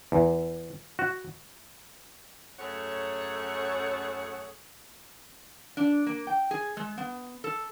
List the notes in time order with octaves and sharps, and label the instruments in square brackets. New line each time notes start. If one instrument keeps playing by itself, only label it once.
[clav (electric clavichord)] E2
F#4
[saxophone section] F#2 A3 C#4 G#4 C#5 F#5
[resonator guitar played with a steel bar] D4
A#3
G5
G#4
G#3
B3
A4